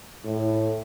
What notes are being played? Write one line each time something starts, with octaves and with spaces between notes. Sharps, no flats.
A2